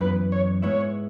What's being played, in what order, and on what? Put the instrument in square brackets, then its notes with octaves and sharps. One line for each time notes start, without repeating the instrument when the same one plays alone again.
[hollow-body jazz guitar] F#2 E3 B3 [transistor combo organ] B4
[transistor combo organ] C#5
[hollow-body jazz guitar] G#2 G#3 B3 E4 [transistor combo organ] C#5